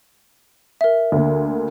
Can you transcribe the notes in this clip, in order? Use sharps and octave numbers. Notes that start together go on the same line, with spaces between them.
A#4 E5
D2 D3 A#3